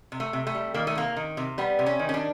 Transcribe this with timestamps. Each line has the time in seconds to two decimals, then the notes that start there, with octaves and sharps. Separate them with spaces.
0.12 C3
0.20 A3
0.33 C3
0.47 A3
0.55 G3
0.74 D#3 A#3
0.87 A3
0.95 C3 A#3
1.17 D#3
1.37 C3
1.58 G3 B3
1.79 C3
1.86 C#4
1.99 D#3
2.09 C#4
2.14 D4